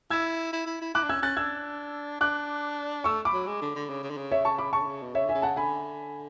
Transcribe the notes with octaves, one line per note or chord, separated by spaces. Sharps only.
E4 E6 G#6
E4
E4
E4
E4 D6 F#6
D4
C#4 E6 G#6
C#4 F#6 A6
D4 E6 G#6
D4 D6 F#6
A3 C#6 E6
B5 D6
F#3
G#3
D3
D3
C#3
C#3
D3
C#3
C#5 E5
A5 C#6
B5 D6
C#3 A5 C#6
D3
C#3
B2
C#3 C#5 E5
D3 E5 G#5
C#3
F#5 A5
D3 G#5 B5